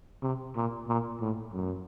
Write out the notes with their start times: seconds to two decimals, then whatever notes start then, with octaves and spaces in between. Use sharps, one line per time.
0.22 C3
0.55 A#2
0.88 A#2
1.20 A2
1.53 F#2